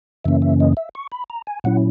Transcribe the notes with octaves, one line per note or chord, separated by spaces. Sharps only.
F#2 C#3 E3 A#3 C#4 E5
E5
D#5
E5
C#6
B5
A#5
G#5
A#2 F#3 C#4 E4 F#5